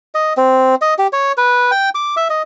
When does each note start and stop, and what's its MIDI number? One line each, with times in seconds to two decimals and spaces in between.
0.15 0.33 75
0.37 0.75 60
0.81 0.94 75
0.98 1.07 67
1.13 1.32 73
1.37 1.71 71
1.71 1.89 79
1.95 2.15 86
2.17 2.28 76
2.30 2.42 75